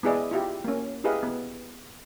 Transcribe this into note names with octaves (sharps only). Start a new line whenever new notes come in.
B3 E4 G#4 D5 D#5
E4 F4 G4
A#3 C#4
E4 G4 G#4 B4 D#5 F5
B3